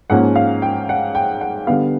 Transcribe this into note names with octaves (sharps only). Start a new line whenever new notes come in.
G#2 F3 A#3 C#4 F#5
F5
G5
F#5
G5
F#5
D3 G3 B3 F5